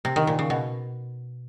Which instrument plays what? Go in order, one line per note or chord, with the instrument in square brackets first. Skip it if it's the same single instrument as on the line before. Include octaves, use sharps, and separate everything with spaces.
[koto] C3
D#3
A#2
C#3
B2